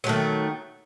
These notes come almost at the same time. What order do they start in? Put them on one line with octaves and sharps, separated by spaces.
F#3 A3 D#3